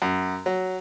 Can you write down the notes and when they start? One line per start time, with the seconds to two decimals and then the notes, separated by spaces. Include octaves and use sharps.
0.02 F#2
0.46 F#3